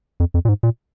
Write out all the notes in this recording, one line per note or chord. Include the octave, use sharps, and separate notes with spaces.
F2
F2
A#2
G#2
A#2